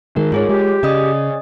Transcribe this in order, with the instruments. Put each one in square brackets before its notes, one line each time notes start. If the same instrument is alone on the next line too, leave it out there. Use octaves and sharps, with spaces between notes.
[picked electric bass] D#3 G#3 [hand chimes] A#4
[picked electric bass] G#2 [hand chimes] F4 G#4 C#5
[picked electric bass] G#3 [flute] G4
[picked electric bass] C#3 [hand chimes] D5 D#5 D#6